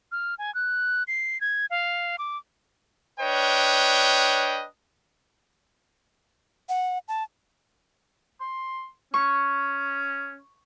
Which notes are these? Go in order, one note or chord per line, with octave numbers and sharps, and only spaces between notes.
F6
G#5
F#6
C7
G#6
F5
D6
D4 B4 C#5 D#5 G5
F#5
A5
C6
C#4 C#6